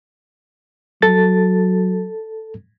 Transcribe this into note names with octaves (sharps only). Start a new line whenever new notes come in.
F#3 A4 A6